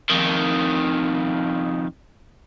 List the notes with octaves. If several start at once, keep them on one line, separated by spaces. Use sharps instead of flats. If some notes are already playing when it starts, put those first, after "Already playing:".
F2 D#3